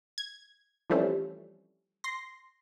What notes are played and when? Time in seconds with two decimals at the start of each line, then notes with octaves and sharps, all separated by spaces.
0.18 G#6
0.90 E3 F3 G3 A3 C4 C#4
2.04 C6 A#6